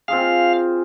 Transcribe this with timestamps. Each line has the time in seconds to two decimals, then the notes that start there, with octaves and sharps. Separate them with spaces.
0.08 C4 F4 G#4 F5